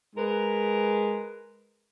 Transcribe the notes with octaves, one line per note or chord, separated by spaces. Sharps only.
G#3 A#4 B4